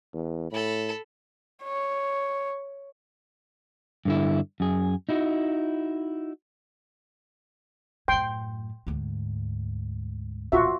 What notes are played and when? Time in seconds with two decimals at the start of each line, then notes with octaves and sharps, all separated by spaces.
0.14 E2
0.52 A2 A4 B5
1.63 C#5
4.05 G2 D3 E4
4.60 F#2 G#4
5.09 D#4 E4 F#4
8.08 F#2 A2 G5 C6
8.87 D2 G#2
10.52 D#1 B2 F4 F#4 E5